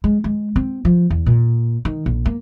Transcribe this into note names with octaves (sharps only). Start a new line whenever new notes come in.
G#3
G#3
C4
F3
E2
A#2
D#3
A#1
A#3